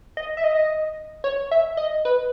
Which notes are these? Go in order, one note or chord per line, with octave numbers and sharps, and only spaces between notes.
D#5
E5
D#5
C#5
E5
D#5
B4